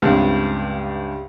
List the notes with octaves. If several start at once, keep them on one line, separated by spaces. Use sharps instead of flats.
C#2 G2 C3